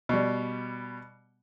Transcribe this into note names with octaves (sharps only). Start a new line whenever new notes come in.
B2 G3